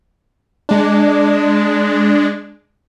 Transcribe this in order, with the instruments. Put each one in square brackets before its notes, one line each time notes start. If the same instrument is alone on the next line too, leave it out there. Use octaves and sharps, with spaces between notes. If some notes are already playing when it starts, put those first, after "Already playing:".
[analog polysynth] G#3 D4